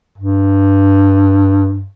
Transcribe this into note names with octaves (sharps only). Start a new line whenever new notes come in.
G2